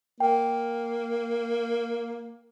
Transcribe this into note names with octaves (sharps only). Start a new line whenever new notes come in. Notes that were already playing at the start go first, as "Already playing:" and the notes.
A#3 G5